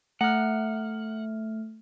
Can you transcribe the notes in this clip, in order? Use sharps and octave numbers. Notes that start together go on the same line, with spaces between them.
A3 F#5 F6